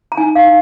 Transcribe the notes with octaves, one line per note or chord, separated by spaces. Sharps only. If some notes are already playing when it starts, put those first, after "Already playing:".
A#5
D#4 G#5
F5
D#4